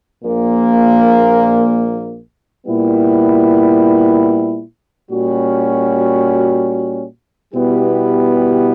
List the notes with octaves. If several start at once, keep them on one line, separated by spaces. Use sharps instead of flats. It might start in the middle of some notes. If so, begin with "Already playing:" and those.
A#1 A#2 A#3
A#2 G3 B3 E4
A#2 G3 C#4 F#4
B2 G3 B3 E4 G4